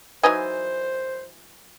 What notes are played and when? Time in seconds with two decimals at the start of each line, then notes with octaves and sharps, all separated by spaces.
0.23 E3 F#3 D#4 B4 C5 D#5 G#5